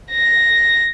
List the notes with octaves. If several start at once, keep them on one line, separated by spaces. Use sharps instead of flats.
A#6